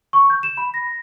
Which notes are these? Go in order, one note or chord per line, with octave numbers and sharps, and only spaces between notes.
C#6
G6
E7
B5
A#6